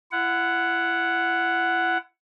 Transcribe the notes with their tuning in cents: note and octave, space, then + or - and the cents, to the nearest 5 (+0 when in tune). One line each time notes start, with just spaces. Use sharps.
E4 +35 F#5 +0